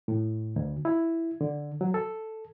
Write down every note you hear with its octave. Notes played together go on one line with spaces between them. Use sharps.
A2
D2
E4
D3
F#3
A4